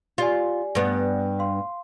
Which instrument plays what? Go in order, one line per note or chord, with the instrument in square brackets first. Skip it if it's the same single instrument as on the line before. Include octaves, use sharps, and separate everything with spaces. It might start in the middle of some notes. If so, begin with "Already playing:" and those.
[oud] F4 [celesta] G4 D5 G#5
[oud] G2 B3
[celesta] F5 C6